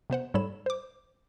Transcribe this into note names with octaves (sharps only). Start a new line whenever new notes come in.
C3 B3 C5 F#5
G#2 G3 A4 C#5 B5 E7
C5 D6